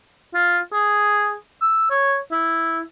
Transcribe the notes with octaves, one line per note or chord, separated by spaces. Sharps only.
F4
G#4
E6
C#5
E4